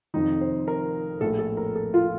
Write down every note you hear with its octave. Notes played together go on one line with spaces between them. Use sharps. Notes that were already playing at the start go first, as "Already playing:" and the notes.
F1 F2 D#3 D#4
C5
A#4
A#1 A2 A3 A4
A4
A#4
A4
F4